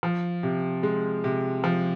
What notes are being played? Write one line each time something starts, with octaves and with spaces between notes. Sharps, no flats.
F3
C3
G#3
C3
F3